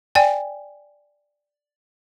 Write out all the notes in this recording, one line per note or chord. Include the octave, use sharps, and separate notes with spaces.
D5 G5 G#5